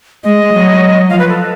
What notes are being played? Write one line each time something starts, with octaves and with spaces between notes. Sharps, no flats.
G#3 D#5
F#3
F3 F5
B4
A4